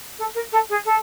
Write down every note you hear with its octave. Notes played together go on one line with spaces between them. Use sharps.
A4
A#4
A4
G#4
A4